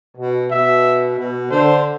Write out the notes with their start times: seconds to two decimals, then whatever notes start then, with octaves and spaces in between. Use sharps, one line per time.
0.17 B2
0.51 B2 E5
1.18 B2
1.51 D3 C5